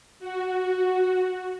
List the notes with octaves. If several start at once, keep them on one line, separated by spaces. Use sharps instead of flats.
F#4